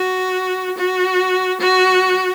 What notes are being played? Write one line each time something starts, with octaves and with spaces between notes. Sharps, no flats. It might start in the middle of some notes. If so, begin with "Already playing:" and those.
Already playing: F#4
F#4
F#4